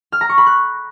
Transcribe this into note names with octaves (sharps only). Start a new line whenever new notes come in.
F6
A#5
C#6
B5
F#6